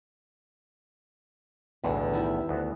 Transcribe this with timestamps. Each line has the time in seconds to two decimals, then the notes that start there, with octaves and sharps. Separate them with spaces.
1.84 B1 E2 A2 D3 B3
2.12 D#3 G3 E4
2.49 D2 B3 F#4